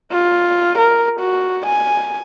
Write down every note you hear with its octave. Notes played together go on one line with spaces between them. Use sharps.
F4
A#4
F#4
G#5